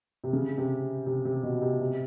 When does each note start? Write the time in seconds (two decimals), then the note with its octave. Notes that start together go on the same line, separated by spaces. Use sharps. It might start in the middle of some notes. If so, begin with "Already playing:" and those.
0.24 C3
0.33 C#3
0.58 C3
1.06 C3
1.25 C3
1.43 B2
1.62 C3
1.80 C3